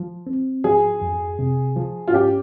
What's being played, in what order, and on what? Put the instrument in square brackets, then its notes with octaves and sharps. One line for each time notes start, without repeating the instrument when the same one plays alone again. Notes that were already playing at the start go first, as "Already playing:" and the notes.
Already playing: [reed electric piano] F3
C4
[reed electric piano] F3 [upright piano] G#4
[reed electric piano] F2
C3
F3
[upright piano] F4
[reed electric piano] C#4 [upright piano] G4